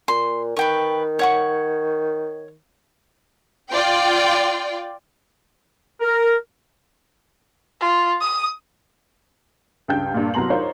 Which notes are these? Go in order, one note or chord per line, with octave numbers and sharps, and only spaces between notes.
A#2 C6
D#3 B4 G5 C#6
C#5 F#5 C#6
F4 D5 G5
A#4
F4
D#6
C#2 G2 G5 G6
G2 A#2
C2 F#3 B3 A#5 C6 F#7
D4 D#4 F4 A#4 C5 C#5